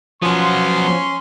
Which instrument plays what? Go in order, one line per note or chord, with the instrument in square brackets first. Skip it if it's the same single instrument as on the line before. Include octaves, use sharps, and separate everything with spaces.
[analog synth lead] F3 [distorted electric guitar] F#3 B3 [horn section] C#4 C6